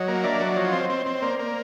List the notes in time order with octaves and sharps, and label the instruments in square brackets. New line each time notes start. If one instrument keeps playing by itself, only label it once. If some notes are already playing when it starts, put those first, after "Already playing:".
Already playing: [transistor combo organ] F#3 [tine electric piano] C#5 D#5
[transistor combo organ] A#3
[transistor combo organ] D4 [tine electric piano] D5 E5
[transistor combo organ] F#3
[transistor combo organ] F3 [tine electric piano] C#5 D#5
[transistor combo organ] C4
C4
C4
[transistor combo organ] A#3 [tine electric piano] C5 D5
[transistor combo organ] A#3